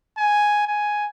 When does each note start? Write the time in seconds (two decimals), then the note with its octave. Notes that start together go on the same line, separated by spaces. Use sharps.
0.18 G#5
0.67 G#5